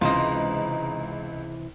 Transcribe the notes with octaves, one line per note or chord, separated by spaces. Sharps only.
C#2 C3 E3 D#4 F4 C5 D#5